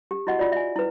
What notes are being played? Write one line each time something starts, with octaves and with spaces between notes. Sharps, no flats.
G4
E4 F#4 D#5 F#5
F4 D5
E5 G#5
E4 B4